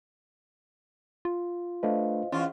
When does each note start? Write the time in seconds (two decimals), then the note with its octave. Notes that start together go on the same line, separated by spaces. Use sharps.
1.25 F4
1.83 A3 D4 B4 C5 D#5 F5
2.32 E2 C#4 F4